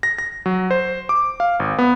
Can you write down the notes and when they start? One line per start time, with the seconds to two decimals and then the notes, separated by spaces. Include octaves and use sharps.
0.03 A#6
0.18 A#6
0.46 F#3
0.71 C5
1.09 D6
1.40 F5
1.60 G#1
1.79 B3